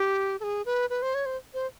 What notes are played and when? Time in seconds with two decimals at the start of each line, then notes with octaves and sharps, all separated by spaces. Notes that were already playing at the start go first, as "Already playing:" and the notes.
Already playing: G4
0.40 A4
0.43 G#4
0.66 B4
0.90 B4
1.02 C5
1.15 C#5
1.26 C5
1.54 C5